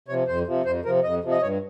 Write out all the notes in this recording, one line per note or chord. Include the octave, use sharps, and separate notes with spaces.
C3 F3 C#5
F2 C5
C3 F3
F2 C5
C3 F3 A#4
F2 D#5
C3 F3
D#5
G2 C#5